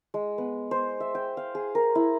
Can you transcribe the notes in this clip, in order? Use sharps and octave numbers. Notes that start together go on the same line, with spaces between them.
G#3
B3
C5
E5
G5
F5
G#4
A#4
E4